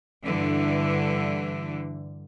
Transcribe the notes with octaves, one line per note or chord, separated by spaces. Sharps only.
G2 D3 E3